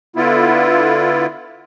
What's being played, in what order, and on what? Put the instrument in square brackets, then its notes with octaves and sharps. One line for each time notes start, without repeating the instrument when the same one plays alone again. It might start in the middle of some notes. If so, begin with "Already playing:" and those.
[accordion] D3 B3 E4 F4